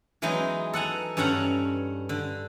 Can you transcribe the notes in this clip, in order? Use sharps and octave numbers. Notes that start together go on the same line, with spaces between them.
E3 F#3 G#3 B3 D#4
A4 F#5 G#5 A#5
G2 C#4 A4 C#5 F#5 A#5
D3